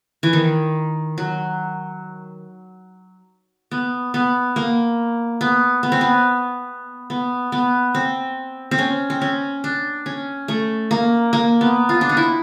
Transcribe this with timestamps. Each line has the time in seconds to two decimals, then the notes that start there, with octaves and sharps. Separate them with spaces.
0.23 E3
0.33 D#3
1.18 F#3
3.71 B3
4.14 B3
4.56 A#3
5.41 B3
5.83 B3
5.92 C4
6.01 B3
7.10 B3
7.52 B3
7.95 C4
8.71 C4
8.79 C#4
9.10 C4
9.21 C#4
9.64 D4
10.06 C#4
10.48 A3
10.91 A#3
11.33 A#3
11.61 B3
11.89 F4
12.01 D4
12.09 D#4
12.17 E4